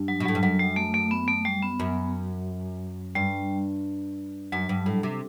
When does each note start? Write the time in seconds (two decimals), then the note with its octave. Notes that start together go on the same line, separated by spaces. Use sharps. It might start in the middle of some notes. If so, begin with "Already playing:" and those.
Already playing: G2
0.08 F#3
0.20 B2
0.25 F#3
0.28 A2
0.35 G2
0.43 F#2 F#3
0.59 G3
0.76 A3
0.94 A3
1.11 B3
1.28 A3
1.45 G3
1.62 B3
1.80 F#2
3.15 G2 G3
4.52 F#2 F#3
4.69 G2
4.86 A2
5.03 C3